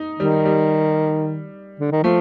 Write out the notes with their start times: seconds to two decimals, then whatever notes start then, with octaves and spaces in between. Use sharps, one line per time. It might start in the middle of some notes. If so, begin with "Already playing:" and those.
Already playing: D#4
0.19 D#3 G3
0.45 G3
1.80 D3
1.92 D#3
2.03 F3 A3